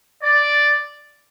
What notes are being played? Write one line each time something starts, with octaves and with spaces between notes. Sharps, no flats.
D5